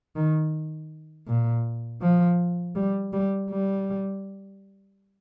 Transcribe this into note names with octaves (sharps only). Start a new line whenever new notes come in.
D#3
A#2
F3
G3
G3
G3